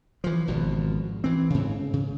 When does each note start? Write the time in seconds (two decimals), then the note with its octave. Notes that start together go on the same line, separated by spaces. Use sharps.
0.24 E3 F3
0.48 G#1 B2 F3
1.24 E3 C4
1.50 G#2 C#3
1.93 C#3